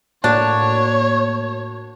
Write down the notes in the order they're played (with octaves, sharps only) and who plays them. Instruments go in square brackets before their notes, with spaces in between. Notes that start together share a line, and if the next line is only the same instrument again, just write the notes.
[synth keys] A2 A#3 F#4 [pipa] D4 [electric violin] C#5